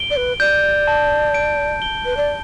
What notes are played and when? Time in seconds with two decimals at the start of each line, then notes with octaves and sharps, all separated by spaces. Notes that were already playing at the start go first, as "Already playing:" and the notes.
Already playing: D7 G7
0.10 D5
0.16 B4
0.40 D5 G6
0.87 A5
1.34 D7
1.82 G7
2.05 B4
2.17 D5